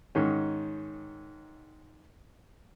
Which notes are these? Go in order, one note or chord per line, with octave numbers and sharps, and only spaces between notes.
G#2 D#3 C#4